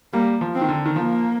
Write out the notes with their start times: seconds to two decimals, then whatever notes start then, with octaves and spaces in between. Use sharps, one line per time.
0.13 G3 A#3
0.41 F3
0.55 C4
0.61 D#3
0.69 D3
0.86 D#3
0.96 F3 A#3